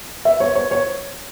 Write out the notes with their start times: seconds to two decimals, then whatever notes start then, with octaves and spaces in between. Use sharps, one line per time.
0.25 E5
0.40 C#5
0.55 C#5
0.71 C#5